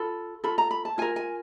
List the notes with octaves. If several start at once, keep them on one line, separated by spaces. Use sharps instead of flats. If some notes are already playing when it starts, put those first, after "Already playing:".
Already playing: F4 A4 B5
F4 A4 B5
A#5
B5
A5
F4 A#4 G#5
G#5